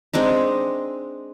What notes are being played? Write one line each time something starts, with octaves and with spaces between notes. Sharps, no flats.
G#3 C4 D4 D#4